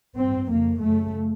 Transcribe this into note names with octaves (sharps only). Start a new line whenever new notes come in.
G2 C4
F2 C#3 A#3
F#2 C#3 A3